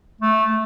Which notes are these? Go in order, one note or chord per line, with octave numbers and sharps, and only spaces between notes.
A3